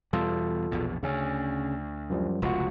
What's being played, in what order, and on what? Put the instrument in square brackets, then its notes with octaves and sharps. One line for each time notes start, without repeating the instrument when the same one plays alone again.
[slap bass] E2 B2 G3 [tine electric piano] F4 A4
[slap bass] A#1 E2 B2
[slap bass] D2 [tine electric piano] C#3 C#4
[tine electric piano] F#2 F3 G3
[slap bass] F1 C#2 B2 [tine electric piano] F4 F#4